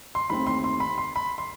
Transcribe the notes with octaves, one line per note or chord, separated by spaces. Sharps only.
C6
D#2 D#3 A3 C4 B5
C6
C6
B5
C6
B5
C6